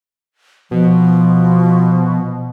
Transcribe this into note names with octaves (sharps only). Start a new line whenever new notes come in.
B2 F3